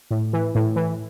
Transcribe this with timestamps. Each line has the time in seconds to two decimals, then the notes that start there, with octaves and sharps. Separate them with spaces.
0.11 A2
0.33 E3
0.55 A2
0.76 E3